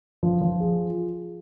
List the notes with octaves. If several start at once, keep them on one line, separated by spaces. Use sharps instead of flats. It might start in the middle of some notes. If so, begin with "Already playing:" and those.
F3
F3
G#4